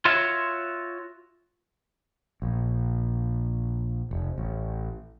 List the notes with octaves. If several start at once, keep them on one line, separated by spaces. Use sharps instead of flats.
F4 F#4 C#5 E5
A#1
F1
A1